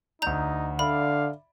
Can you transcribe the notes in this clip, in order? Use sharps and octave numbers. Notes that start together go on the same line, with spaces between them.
D2 D4 D#4 A#5 G6
D3 D5 E5 F5 B5